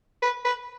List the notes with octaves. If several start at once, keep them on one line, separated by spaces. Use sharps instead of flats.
B4
B4